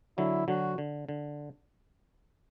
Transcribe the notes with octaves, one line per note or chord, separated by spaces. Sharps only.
D3 F#3 E4
D3 F#3 F#4
D3
D3